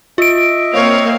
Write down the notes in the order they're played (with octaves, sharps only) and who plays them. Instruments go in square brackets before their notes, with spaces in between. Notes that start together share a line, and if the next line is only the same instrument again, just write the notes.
[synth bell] F4 D7 [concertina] D#5 E5
[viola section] A#3 C4 F5 [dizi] C#5